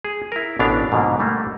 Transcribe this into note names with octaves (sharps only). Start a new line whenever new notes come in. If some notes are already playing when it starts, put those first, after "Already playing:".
G#4
E4 A#4
A1 B2 E3 B3 D4 F5
G#2 B2 D3 F3 A#3
G3 A3 A#3